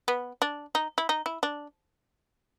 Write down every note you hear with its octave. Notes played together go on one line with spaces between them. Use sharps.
B3
D4
D#4
E4
D#4
E4
D4